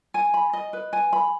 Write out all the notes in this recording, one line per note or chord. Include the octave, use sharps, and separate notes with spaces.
G#5
B5
D#5
B4
G#5
B5